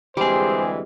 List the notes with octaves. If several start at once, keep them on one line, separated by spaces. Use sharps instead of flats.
D2 E3 G3 G#3 C4 G4 G#4 C5